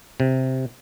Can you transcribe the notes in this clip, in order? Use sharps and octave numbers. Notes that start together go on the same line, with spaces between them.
C3